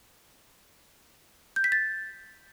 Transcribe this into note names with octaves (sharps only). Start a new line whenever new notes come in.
G6
B6
A6